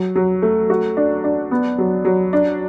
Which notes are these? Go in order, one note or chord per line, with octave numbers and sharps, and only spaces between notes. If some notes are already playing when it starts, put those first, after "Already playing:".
Already playing: F#3
F#3
A3
F#4
D4
D4
B3
F#3
F#3
D4